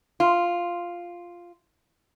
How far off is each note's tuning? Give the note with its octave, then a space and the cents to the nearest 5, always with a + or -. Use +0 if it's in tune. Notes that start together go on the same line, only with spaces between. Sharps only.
F4 +0